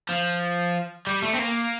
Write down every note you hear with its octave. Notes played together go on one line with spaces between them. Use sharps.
F3
G3
A3
C4
A#3